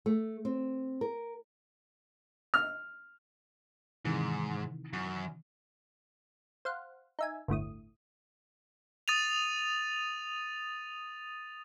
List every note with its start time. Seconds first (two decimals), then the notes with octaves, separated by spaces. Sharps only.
0.06 A3
0.45 C4
1.01 A#4
2.54 F6
4.05 G#2 C3 D#3 E3
4.93 F#2
6.65 C5 F5 F#5
7.19 D#4 E5 G#5
7.48 G1 D2 A2 D#6
9.08 D#6 A6 D#7 F7